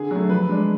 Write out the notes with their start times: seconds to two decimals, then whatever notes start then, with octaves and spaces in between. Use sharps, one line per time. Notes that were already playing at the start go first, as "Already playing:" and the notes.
Already playing: D3 G#4
0.11 F#3 A3
0.29 F3 B4
0.49 G#3 D4